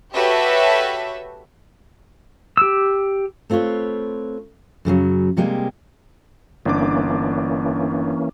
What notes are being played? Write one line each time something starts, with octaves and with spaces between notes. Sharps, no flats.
F#4 G4 A4 B4 C#5 E5
G4 E6
A3 C4 F4 B4 C#5
F#2 C#3 E3 F#3
C3 G3 G#3 A#3 C4
G1 E3 A#3 C#4 D4 D6